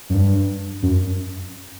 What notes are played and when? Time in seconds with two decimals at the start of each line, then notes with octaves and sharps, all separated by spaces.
0.10 F#2
0.14 G2
0.83 F#2